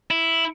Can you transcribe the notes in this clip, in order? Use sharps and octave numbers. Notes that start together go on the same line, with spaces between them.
E4